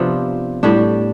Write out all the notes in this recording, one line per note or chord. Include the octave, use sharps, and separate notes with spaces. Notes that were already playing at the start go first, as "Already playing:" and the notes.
Already playing: C3 F3 B3 D4
A2 G3 D4 G4